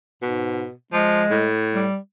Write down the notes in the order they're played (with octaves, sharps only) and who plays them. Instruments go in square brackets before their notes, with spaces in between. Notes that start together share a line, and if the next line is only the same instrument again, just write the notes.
[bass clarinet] G#2 [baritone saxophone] B2
[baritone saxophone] F3 [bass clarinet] G#3
[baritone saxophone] A2
[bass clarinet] G3